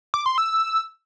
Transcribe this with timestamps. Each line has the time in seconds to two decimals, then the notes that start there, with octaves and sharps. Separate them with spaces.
0.14 D6
0.26 C6
0.38 E6